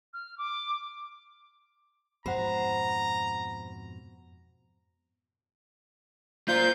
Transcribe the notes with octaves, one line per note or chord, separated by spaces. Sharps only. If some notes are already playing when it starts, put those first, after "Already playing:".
F6
D6
F2 G#2 B2 C5 F#5 A#5 B5
A#3 F4 C5 G6